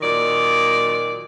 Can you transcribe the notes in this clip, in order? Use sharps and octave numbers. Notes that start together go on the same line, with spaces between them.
A#2 D#3 F#3 D5